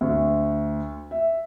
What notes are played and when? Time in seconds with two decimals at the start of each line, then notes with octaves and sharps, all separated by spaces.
0.01 D2
1.11 E5